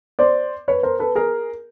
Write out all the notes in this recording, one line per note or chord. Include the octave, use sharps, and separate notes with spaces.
C5 D5
B4 C#5
A#4 C5
A4 B4
G#4 A#4